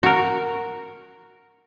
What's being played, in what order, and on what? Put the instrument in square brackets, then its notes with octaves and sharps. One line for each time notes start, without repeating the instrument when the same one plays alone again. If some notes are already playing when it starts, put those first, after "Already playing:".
[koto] F#4 A#4